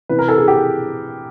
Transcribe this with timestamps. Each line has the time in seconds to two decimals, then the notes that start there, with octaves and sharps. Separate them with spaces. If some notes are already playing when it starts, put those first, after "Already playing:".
0.09 C3 E3 B4
0.19 A#4
0.29 A4
0.38 G#4
0.48 G4